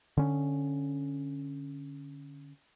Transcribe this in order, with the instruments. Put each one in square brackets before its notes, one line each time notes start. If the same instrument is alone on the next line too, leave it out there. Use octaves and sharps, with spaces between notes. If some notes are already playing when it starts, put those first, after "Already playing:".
[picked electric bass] D3 C#4